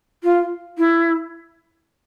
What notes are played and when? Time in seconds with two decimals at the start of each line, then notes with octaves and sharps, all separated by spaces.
0.23 F4
0.78 E4